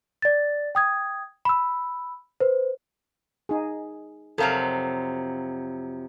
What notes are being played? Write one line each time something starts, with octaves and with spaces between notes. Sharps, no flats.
D5 A6
G5 D#6 G#6
B5 E6
B4 C5
D#4 G#4
F2 C3 F#3 A4 A#4 F5